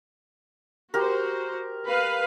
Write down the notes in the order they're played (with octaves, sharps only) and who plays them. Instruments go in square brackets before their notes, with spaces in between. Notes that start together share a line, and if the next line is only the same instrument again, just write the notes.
[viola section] F#4 C5 [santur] G4 A#4
[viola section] B4 F5